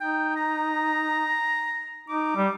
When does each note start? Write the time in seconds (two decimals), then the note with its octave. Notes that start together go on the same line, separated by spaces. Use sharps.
0.01 D#4 G5
0.36 A#5
2.09 D#4 D6
2.36 G3